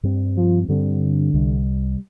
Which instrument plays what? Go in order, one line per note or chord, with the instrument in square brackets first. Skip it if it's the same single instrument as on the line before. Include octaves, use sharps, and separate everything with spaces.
[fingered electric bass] G2 G3 C4
[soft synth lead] F3
[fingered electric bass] G2 G3 C4 [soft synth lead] D3
[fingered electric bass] C2 C3 G3